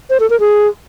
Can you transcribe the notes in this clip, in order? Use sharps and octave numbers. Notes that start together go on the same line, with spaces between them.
C5
A4
A#4
G#4